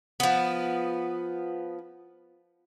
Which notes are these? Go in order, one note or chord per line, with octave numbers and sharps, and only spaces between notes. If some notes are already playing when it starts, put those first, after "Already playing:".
F3 B3